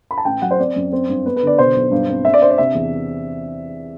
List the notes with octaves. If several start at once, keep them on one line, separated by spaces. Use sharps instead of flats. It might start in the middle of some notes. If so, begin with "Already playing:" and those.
B5
A5
A1 G5
F#3 F#5
C5
C4 D5
F#2
C4
G2
B3 B4
B4
D3 D5
B2 C5
B1
G2
C4
D4 E5
D5
D4 C5
D5
C3 E5
E2